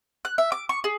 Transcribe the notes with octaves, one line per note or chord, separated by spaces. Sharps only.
F#6
E5
D6
C#6
G#4